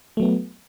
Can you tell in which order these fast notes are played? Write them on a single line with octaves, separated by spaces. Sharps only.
A3 F#3 B3